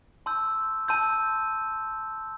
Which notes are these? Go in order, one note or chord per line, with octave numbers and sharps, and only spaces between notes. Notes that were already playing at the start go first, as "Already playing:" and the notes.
A5 C6 E6 G6
A5 C6 E6 G6